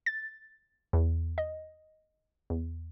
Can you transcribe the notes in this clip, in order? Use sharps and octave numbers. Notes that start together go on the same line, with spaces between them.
A6
E2
D#5
E2